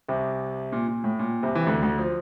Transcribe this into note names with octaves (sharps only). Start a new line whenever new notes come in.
C2 C3
A#2
A#2
A2
A#2
C2 C3
E3
D2 D3
D2 D3
F3